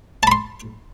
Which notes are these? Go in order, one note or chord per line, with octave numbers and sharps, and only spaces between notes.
A5 B5 C6